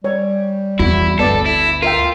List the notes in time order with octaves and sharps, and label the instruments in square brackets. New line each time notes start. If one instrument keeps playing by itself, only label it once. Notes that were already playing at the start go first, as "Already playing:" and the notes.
[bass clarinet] G3 [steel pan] C#5
[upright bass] E2 [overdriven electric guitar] E4 [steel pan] F#4
[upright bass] G1 D2 [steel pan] B3 D5 [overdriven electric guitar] A4
[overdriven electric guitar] E4
[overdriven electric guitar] F4 [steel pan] A#4 E5 G5